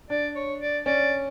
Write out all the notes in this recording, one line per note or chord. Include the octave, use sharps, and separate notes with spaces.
D4 D5
C#5
D5
C#4 D5